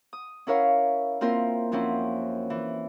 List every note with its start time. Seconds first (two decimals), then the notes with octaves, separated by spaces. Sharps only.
0.13 D#6
0.47 C#4 E4 A#4 C#5 F5
1.21 A#3 C4 E4 F4 A#4
1.72 F#2 F3 C4 C#4 E4
2.50 E3